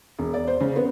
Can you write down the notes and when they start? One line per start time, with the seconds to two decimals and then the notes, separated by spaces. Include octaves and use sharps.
0.19 E1
0.34 D5
0.47 C5
0.61 C#3
0.76 B3